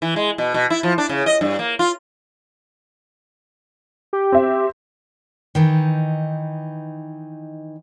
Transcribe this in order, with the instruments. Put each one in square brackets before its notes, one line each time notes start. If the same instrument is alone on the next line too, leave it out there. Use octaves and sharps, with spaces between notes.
[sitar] E3
G#3
B2
B2
E4
F3
D4
C#3
D#5
G2
A#3
F4
[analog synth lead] G4
[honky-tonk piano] C4 E5
[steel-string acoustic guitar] D#3 E3 D#4